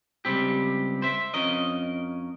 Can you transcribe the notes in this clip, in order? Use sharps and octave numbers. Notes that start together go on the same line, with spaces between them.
C#2 G3 C4 G4
C5 E5
F2 C#4 A#4 D#5